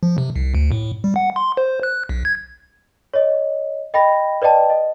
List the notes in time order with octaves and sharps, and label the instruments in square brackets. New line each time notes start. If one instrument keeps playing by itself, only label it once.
[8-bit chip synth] F3
C3
C2
D2
A2
G3
F#5
C6
C5
F#6
B1
G#6
[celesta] C#5 D#5
D#5 G5 B5 A#6
B4 D5 D#5 G5 A5
D#5